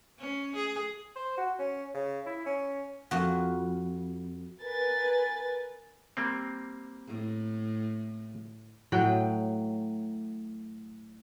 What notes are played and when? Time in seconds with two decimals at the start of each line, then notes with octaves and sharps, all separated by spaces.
0.19 C#4
0.56 G#4
1.16 C5
1.38 F#4
1.59 C#4
1.94 C#3
2.26 E4
2.46 C#4
3.11 F2 F#4
4.63 A#4 B4 G#5 A6
6.17 G3 A#3 C4
7.08 A2
8.92 A2 F#3 G5